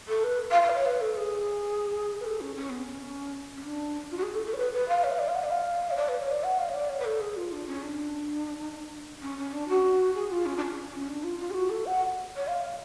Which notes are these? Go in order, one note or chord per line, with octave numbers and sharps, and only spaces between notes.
A4
B4
F5
F5
B4
C#5
B4
A4
G#4
B4
A4
C#4
C#4
B3
C#4
C#4
D4
F4
F#4
G#4
A4
A4
C#5
B4
B4
F5
C#5
F5
D5
F5
F#5
D5
F5
C#5
D5
B4
C#5
D5
F#5
F5
C#5
D5
C#5
B4
A4
G#4
F4
D4
C#4
D4
C#4
C#4
D4
F#4
G#4
F4
C#4
D4
C#4
C#4
D4
F4
F4
G#4
F#4
A4
F#5
C#5
F5